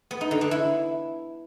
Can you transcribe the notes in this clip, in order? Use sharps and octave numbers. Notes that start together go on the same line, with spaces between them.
B3
D#4
D3
D4
E4